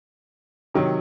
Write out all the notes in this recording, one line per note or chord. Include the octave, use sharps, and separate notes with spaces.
C3 D#3 F#3